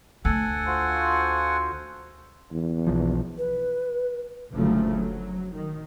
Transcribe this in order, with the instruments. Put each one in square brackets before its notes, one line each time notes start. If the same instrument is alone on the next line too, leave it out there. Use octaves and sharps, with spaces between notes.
[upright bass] D2 [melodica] A4 F#5 G#5
[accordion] F4 F#4 C5
[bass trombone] E2
[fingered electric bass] B1 F3
[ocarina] B4
[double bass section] F#1 D2 C#3 F3 F#3 A3
F#3
D#3